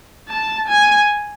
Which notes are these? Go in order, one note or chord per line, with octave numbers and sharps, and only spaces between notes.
A5
G#5